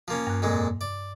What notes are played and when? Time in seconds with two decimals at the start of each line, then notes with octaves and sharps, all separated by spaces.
0.08 F3 A#3 C#4
0.27 G2 F#6
0.42 F2 A#2 G#3
0.81 D5